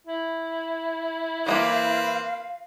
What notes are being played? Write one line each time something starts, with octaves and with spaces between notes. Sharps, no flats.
E4
E3 G3 A#3 C4 B4 F5